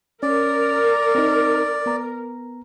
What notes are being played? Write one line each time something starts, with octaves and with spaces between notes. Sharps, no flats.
C#4 A#4 D5
C4 D#4
B3 A#5